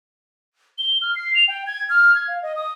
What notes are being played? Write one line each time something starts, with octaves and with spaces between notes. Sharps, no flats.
G7
F6
C7
F7
G5
G#6
F6
G#6
F5
D#5
D#6